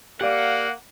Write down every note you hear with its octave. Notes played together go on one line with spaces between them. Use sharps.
A#3 G4 D5 F5 F#5